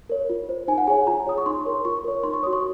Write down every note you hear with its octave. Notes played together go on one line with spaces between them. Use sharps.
A#4 C#5
F4
C5
D#4 G#5
F#5
G#4 C#5 G#5
F4 A#5
G#4 C#5 D#6
C#6
D#4 C6
A#4 C#5
F4 C#6
A#4 C#5
D#4 C6
C#6
F#4 C#5 D#6
C#6